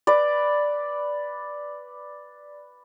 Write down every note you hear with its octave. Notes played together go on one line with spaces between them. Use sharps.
B4 D5